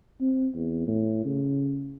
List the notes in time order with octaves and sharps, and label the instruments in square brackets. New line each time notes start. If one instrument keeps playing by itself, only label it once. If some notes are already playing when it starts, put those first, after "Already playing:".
[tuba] C4
E2
A2
C#3